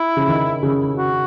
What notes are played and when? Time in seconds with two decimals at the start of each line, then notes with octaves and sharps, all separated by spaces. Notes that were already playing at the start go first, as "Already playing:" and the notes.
Already playing: E4
0.17 C#3
0.28 D#3
0.63 C#3
0.97 F#4